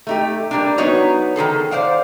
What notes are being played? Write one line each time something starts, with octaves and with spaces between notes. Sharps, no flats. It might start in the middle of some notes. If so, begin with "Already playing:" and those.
A3 D#4 G4
G3 A#3 D4
F#3 B3 D#4 F#4 C#5
D#3 F4 G#4 A4
C5 D5 F5 F#5